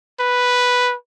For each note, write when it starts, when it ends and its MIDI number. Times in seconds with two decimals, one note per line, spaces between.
0.20 0.95 71